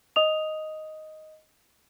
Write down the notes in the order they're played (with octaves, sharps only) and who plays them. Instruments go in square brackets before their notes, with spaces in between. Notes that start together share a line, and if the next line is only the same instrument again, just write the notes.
[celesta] D#5 D#6 F7